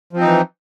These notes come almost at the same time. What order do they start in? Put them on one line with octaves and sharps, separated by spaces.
F3 C4 D#4 E3